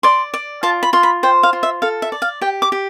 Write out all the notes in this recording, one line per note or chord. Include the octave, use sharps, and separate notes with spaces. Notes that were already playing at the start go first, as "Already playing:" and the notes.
D5 C6
D5
F4 A5
B5
F4 C6
B5
C5 G5
F5
F4
E5
A4 F5
E5
D5
F5
G4 G5
D6
G4